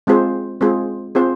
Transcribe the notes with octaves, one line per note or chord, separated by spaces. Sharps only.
G#3 C4 F4 G#4 C5
G#3 C4 F4 G#4 C5
C4 F4 G#4 C5